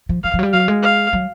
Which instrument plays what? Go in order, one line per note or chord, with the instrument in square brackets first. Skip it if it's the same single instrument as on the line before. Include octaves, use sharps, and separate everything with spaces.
[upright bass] F3
[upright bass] F3 [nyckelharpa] F5
[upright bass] F3
F#3
G3
[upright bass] F#3 [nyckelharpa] F5
[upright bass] G#3
[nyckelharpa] F5
[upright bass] F#3